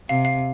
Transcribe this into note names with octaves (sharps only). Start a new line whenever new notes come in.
C3 F5
F5